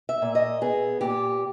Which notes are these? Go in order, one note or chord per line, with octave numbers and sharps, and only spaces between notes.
E5
A#2
D#5
B3 G#4
A#2 G4